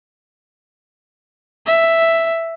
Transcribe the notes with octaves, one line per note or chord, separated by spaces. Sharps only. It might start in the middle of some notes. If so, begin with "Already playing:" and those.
E5